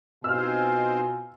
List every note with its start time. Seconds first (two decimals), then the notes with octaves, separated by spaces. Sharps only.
0.24 B2 C4 D#4 F4 C5 G#5 E6 F6